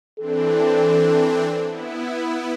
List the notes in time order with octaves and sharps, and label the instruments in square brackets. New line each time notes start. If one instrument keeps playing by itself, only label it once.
[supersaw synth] E3 C4 D4 [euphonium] A4
[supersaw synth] B3 E4